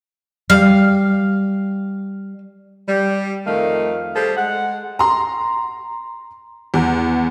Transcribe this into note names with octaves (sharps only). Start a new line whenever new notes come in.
G3 F5
G3
F2 D#3 A3 D#4 F5
G3 G#4 A4 C5
G#3 F#5
A#5 C6
E2